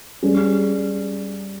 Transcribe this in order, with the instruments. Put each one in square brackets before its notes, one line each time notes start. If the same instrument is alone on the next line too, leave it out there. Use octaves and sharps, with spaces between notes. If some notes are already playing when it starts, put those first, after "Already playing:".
[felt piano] G3 C#4 G#4